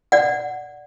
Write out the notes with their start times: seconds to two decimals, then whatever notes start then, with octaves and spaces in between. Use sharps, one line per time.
0.12 D5 F#5